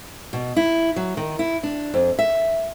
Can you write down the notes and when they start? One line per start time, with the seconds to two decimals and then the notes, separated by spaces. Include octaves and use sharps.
0.33 B2
0.56 E4
0.96 F#3
1.17 D#3
1.39 E4
1.63 D4
1.94 F2
2.19 E5